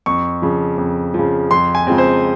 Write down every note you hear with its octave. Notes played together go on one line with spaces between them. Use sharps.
F2 C#6
C#3 F3
F2
F3
C#3
F2 C6
G#5
C#3 F3 G#3 C4
C5